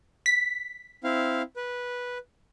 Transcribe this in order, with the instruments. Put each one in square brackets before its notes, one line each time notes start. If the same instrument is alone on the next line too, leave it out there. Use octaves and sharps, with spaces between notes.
[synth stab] B6
[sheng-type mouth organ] C4 E4 F5
B4